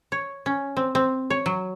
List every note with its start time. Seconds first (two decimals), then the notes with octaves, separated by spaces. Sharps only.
0.12 C#5
0.46 C#4
0.77 C4
0.95 C4
1.30 C#5
1.46 F#3